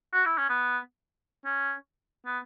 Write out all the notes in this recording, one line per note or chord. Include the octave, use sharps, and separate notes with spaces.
F#4
E4
C#4
B3
C#4
B3